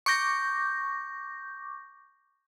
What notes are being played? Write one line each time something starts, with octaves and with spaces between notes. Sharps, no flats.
C#6 D6 G6 A#6